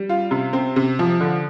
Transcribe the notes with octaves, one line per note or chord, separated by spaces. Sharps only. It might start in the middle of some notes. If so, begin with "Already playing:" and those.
Already playing: G3
F4
C3
C4
C3
F3
D3